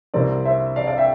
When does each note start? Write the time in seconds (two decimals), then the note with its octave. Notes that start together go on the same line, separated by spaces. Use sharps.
0.14 C2 C3 F3 C4 A#4 D5
0.45 C5 E5
0.76 D5 F5
0.87 D5 F5
0.98 E5 G5